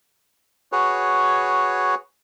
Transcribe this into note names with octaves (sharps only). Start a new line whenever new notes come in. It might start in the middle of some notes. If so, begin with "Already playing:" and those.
F#4 G#4 B4 C#5